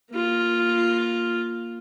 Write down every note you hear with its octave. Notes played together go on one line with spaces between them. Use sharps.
A#3 F4